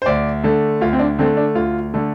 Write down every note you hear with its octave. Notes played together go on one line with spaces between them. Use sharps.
C5
D2 D5
D3 A3
D2 F4
C4
D4
D3 A3 C4
D4
D2 F4
D3 A3